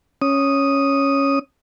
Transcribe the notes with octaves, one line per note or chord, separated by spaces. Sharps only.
C#4 D#6